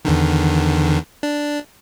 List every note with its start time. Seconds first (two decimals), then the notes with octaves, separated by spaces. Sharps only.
0.05 E2 D3 D#3
1.23 D4